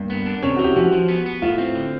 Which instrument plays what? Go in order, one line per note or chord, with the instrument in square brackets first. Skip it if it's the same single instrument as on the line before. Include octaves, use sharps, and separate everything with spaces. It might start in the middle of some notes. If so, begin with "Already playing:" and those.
Already playing: [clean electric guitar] G2 [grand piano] A#3
[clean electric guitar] B3
D4
[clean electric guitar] C3 [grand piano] C#4
[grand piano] F#4
[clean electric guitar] E3 [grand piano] G4
[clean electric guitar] F3 [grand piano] F#4
[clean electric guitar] F3
B3
B3
[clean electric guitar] A2 [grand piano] F4
[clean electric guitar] C4
D3